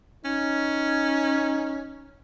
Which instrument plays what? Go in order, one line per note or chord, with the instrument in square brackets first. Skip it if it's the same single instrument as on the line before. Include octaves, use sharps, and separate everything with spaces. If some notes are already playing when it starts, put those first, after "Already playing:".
[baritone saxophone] C#4 [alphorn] D#4